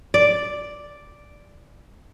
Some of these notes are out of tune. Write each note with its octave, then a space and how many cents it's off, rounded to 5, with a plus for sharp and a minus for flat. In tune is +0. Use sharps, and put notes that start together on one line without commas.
D5 +0